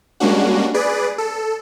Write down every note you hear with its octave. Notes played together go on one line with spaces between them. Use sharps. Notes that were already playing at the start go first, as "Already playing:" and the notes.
G3 G#3 A#3 C#4 D4 F#4
G#4 B4 D5
A4